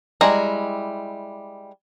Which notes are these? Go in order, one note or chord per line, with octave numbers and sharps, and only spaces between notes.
G3 G#3 E4 A#5